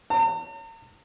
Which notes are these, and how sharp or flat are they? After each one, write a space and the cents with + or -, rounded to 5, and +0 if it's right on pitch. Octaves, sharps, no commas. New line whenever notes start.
A#5 -45